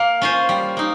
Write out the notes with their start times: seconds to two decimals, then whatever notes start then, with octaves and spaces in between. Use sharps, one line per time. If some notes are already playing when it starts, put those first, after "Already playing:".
Already playing: A#3 F5
0.22 C#4 F4 C5
0.49 G3
0.77 A#3 D#4